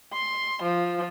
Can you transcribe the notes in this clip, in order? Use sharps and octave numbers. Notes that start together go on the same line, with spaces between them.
C6
F3